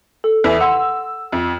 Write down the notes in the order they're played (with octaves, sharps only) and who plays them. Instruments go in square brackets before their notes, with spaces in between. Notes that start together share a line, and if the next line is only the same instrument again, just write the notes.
[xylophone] A4
[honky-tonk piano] E2 E4
[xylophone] F#5 C6 [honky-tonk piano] E6
[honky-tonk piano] F2